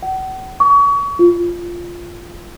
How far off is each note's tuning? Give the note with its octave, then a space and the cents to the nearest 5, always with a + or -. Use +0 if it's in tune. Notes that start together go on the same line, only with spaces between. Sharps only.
F#5 +40
C#6 +35
F4 -5